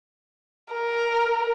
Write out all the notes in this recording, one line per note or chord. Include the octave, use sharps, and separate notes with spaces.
A#4